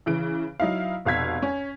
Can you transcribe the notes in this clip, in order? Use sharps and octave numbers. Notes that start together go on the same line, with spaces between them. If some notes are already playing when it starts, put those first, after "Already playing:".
C#3 E3 D7
F#3 D#4 E4 F5
F1 B2 F5 E6 G#6 B6
C#4